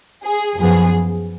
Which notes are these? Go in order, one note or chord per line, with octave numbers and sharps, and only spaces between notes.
G#4
F#2 F3 B3 G#4